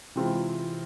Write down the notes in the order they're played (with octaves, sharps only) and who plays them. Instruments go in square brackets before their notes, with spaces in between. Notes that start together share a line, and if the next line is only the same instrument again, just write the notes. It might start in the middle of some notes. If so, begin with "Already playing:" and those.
[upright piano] C3 E3 G#3 C4 F4